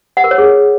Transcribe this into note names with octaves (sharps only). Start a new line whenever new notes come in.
F#5
A#4
C#5
G#4